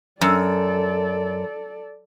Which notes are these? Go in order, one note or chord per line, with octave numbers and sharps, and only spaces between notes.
F#2 A4 D5